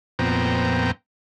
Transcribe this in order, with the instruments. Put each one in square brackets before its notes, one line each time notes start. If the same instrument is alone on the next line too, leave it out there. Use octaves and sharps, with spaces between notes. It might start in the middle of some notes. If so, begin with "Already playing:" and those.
[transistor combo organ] F2 A#2 B3 C4 G5 A#5